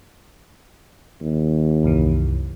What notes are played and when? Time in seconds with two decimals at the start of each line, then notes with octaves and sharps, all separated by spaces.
1.21 D#2
1.84 C2 F#2 E3